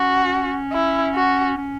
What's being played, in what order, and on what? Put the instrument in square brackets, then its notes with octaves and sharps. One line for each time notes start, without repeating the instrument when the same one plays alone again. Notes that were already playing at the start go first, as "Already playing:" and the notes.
Already playing: [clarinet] C#4 [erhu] F#4
[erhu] E4
F#4
[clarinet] C#4